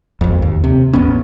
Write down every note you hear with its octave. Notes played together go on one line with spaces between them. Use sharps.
G#1 F2
D#2
C3
A1 E2 B3 C#4